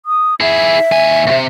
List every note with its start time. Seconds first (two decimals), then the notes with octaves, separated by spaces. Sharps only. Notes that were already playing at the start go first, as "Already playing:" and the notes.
0.06 D#6
0.41 E4 G#4 E5
0.92 D#2 G#5
1.27 D#2 C3